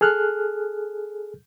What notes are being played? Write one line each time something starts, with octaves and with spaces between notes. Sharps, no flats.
G#4 A4 F6 F#6